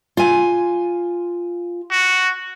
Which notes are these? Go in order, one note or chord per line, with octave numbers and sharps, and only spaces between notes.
F4 G#5
F#4